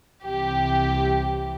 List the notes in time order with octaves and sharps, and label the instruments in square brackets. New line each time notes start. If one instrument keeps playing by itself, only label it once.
[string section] C2 C3 E3 G4